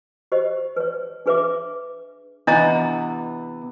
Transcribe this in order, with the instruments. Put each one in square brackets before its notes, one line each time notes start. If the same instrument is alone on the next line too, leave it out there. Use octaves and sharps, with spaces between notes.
[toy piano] G4 C5 D#5
B4 C#5
D4 G#4 B4 C#5 E5 D6
[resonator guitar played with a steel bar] C3 E3 B3 [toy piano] D4 D#5 A#5